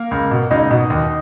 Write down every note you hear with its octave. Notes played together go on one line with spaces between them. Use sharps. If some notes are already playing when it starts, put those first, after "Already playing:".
Already playing: A#3 A#4
C#2
B2
C#2 D#4 D#5
B2
D#2